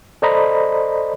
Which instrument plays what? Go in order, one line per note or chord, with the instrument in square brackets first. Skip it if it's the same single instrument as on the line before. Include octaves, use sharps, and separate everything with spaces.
[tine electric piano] A4 C5 D5 D#5 A#5 B5